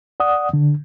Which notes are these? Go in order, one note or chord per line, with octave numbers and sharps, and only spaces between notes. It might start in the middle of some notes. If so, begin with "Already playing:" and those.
D5 F#5 D#6
D3